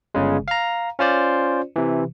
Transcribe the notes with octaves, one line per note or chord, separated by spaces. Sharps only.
G1 C#3 G#3
F5 A#5
C#4 F4 C5 D5
C3 E3